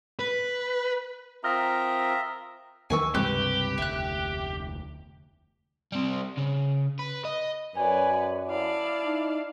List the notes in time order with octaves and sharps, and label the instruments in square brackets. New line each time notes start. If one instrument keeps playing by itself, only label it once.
[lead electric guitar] B4
[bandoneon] C4 F4 A#4 [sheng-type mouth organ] E5 A#5 [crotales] D#6 F6 A#6
[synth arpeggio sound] D#2 D#3 E3 [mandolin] G#5 C#6 E6
[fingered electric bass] C#2 G2 C3 [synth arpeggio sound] E3 G#3 C4 [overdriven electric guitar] G4 [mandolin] B4
[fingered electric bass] F1 D2 [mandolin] E5 F#6
[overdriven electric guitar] G3 C4
C#3
B4
D#5
[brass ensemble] F#2 [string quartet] B4 C#5 D5 [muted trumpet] G#5
[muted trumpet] E4 [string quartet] D5 F5 A5
[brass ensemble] D#4